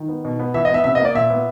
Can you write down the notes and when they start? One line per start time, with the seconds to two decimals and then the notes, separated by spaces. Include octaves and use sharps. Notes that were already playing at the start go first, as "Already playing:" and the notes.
Already playing: D#3
0.09 B3
0.25 B2
0.40 B3
0.54 E3 E5
0.65 D#5
0.70 B3 E5
0.84 C3 E5
0.95 D#5
1.00 A#3 D5
1.15 A#2 E5
1.30 B3